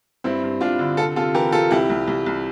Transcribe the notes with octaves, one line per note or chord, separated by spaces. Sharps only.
G2 C4 E4
G2
G2 D4 F4
D3
C3 F4 A4
C3 F4 A4
E3 G4 A#4
C3 F4 A4
C2 E4 G4
C2
C2
C2